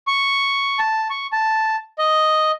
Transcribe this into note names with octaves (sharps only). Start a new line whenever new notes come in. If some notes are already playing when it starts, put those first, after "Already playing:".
C#6
A5
C#6
A5
D#5